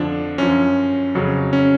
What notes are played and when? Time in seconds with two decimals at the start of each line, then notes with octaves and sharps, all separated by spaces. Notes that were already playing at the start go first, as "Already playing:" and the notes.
Already playing: F2 D3 F3 D4
0.38 F#2 F3 C#4
1.15 F2 C#3 F#3
1.53 C#4